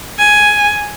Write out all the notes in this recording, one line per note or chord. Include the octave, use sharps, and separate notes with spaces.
G#5